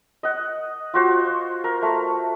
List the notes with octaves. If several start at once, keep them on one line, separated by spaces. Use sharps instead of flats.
D#5 F#5
F4 F#4 C5
A#4
A3